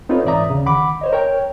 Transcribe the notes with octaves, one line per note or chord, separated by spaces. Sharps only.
C4 D#4 F4 A4 B4 C#5
G#2 E3 D5 E5 A#5 D#6
D#2 C#3
D2 D#3 F#5 B5 D6
C5 C#5 D#5
A#4 C#5 G5